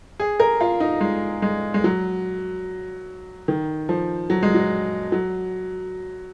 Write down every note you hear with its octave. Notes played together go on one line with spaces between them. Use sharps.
G#4
A#4
F4
D#4
G#3
G#3
G#3
F#3
D#3
F3
F#3
G#3
F#3
F#3